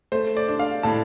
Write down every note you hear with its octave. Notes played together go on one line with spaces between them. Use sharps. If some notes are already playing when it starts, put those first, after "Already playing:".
A3 C5
D5
D4
F5
A2 A5